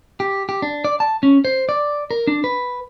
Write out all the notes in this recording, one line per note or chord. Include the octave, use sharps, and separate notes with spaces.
G4
G4
D4
D5
A5
C#4
C5
D5
A#4
D4
B4